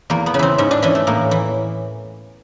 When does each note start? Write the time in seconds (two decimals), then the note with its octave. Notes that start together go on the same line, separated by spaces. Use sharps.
0.10 E2 A#3
0.26 B3
0.34 C#3
0.39 E3 C4
0.58 G#2 C#4
0.71 D4
0.82 E3 C#4
0.95 A3
1.07 A2 A#3
1.31 E3